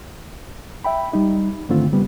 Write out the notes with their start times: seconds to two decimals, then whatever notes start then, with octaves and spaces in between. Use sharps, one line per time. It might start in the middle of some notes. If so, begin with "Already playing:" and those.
0.84 E5 G5 B5
1.13 G3 D#4
1.69 G2 D3 D#3 A3 C4 F4
1.92 C#3 G3 B3